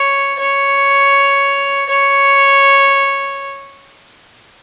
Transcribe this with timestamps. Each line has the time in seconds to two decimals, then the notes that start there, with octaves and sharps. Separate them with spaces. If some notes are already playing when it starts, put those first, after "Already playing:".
Already playing: C#5
0.39 C#5
1.89 C#5